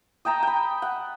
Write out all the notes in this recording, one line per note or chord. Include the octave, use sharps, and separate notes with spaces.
D#5 G5 A5 A#5
G5 B5
F#5